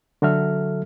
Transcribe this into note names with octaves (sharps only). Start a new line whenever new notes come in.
D3 F#3 F#4 A4 E5 F6